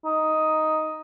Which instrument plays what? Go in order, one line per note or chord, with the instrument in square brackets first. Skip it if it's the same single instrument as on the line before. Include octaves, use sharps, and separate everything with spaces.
[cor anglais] D#4